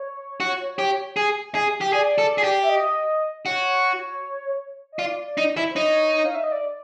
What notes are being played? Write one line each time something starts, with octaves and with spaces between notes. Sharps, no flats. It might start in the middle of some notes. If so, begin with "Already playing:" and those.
Already playing: C#5
F#4
G4
G#4
G#4
G4
G#4 D5
A4
G#4
G4
E5
D#5
F#4 C#5
D#5
F4 D5
D5
D#4
E4
C5
D#4 C#5
F5
E5
D#5
D5